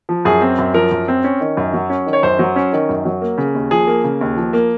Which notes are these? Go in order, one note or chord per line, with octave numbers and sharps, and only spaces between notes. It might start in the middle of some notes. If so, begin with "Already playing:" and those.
F3
F#2 G#4
C4
F#2
F3 A#4
F#2
C4
C#4
D#3
F#2
F#3
C#4
D#3
C#5
F#2 C5
F#3
C#4
D#3
F#2
F#3
A#3
C#3
D#2
F3 G#4
A#3
C#3
D#2
F3
A#3